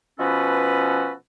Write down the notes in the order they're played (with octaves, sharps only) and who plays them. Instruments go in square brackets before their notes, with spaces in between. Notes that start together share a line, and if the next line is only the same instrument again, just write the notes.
[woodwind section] B2 F3 C#4 F#4 A4 B4